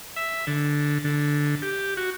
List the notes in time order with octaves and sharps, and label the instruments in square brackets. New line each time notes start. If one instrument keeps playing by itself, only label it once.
[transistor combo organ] E5
D3
D3
G4
F#4